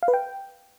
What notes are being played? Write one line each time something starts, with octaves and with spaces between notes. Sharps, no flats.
F5
B4
G5